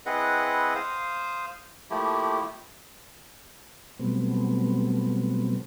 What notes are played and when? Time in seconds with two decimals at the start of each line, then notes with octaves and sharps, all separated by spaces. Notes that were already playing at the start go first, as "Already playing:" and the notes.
0.06 C4 E4 G#4 B4 D#5 F#5
0.75 C5 F5 D#6
1.90 F3 A3 A#3 E4 G4
3.99 B2 F#3 G3 A3 B3 C4